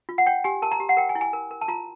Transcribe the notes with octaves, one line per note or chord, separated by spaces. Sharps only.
F4
F#5
C#5 G5
G4 G#5
A#4 A5
A#5
G4
F#5
A#4 G5
G#5
E4
G#5
A#4
A#4
A5
F4 A#5